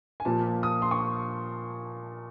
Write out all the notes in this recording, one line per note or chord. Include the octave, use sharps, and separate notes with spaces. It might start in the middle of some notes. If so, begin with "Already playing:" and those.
G#5
A#2 F3 A#3 A5
D#6
C6
C#6